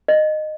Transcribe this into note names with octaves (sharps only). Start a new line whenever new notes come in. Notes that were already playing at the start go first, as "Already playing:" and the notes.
D#5